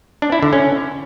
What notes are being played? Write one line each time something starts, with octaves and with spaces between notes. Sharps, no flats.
D4
E4
D3
C#4